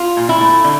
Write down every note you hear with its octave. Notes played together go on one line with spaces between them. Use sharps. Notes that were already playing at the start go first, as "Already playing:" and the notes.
Already playing: F4
A#2
E4
A3
D3